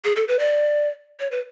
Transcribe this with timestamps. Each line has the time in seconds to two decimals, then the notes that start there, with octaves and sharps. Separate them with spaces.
0.05 G#4
0.16 A4
0.28 B4
0.39 D5
1.20 C#5
1.31 B4